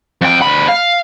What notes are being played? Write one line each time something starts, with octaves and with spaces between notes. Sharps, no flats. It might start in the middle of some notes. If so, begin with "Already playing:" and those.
F2 G5
D2 B5
F5